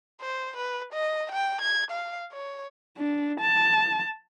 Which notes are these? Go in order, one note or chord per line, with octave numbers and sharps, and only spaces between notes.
C5
B4
D#5
G5
G#6
F5
C#5
D4
A5